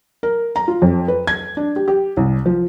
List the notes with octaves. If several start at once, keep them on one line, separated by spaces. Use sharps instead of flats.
A#4
A#5
F4
F2
B4
G#6
D4
G4
G4
C2
F3